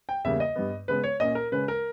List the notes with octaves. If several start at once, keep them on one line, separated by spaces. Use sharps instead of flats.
G5
E2 C#3 G3 A#3 E5
D#5
G2 G3 B3
C#3 G#3 B3 B4
C#5
A#2 A#3 C#4 D#5
A#4
C#3 G#3 C#4 B4
A#4